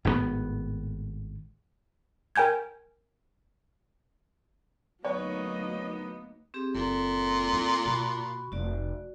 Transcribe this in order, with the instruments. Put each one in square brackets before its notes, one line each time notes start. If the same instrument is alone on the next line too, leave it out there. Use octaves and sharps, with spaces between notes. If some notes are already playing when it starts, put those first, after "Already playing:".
[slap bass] G#1 A2 C3 B3
[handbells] A#4 G5 G#5 G6 G#6
[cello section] D2 A#3 D#4 [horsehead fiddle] F#3 D#5 [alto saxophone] B3 [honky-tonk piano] C#5
[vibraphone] C4 G4 G#4
[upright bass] F#1 [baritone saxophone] A#2 [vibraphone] C4 A4
[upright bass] E4 F4
[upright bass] B2 [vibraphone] F#4 B5 C#6
[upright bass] F1 [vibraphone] F#4 D5